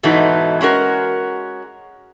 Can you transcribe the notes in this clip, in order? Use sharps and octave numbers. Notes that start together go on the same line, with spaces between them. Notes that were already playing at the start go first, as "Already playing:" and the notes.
G#2 B2 E3 F#3 A3 D#4
G#3 C#4 F#4 A#4